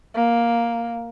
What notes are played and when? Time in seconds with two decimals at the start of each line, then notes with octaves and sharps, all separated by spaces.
0.14 A#3